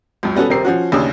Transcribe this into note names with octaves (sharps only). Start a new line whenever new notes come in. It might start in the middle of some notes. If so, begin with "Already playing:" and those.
C#2 F#2
G3 B3 C#4 F#4 A4
D#1 C3 C4 A#4 C7
F3 C#4 F#4
A1 D#2 C#3 D4 D#6 E6